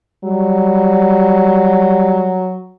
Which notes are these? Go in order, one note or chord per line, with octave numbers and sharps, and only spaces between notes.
F#3 G3